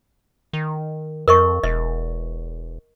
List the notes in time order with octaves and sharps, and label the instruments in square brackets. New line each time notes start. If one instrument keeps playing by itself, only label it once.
[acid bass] D#3
[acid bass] F2 [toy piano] A#4 D#5 C#6
[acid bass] E1 [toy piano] D#5